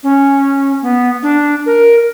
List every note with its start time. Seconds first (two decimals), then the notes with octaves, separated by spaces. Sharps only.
0.03 C#4
0.82 B3
1.23 D4
1.66 A#4